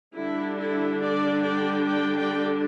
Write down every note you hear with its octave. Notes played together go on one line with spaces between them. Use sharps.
D3 G3 D4 E4
E4 A4
A4 D5
D5 G5
D5 G5
D5 G5